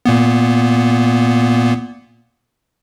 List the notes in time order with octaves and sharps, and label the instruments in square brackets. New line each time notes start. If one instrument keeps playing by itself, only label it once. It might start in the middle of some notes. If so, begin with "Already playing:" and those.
[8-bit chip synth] A#2 A#3 B3